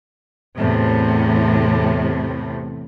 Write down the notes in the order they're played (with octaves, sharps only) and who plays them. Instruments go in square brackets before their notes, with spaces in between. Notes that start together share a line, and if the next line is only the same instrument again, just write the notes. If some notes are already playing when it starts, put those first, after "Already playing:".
[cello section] E2 A2 C3